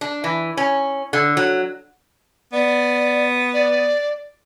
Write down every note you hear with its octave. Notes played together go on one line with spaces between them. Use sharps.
D4
E3
C#4
D3
F#3
B3 D5
D5